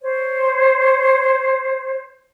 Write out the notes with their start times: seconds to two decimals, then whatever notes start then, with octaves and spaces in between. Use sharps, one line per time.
0.02 C5 C#5